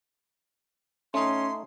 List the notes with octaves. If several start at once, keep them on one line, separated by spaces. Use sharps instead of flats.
A3 C#4 D#4 C6